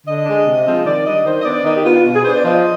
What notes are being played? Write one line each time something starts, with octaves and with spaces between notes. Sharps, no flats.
D3 D#5
G#3 D4
C3
F3 G#3 C4
D#3 D5
G3 D4 D#5
D#3 C5
D#5
B3 D4 D5
D#3 D#5
G4
B3 D4 F4
F4
B2
G#4
B3 D4 C5
D5
F3 D#5